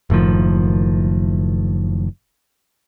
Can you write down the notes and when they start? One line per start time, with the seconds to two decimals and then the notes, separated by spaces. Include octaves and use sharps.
0.10 F#1 A2 D#3 F3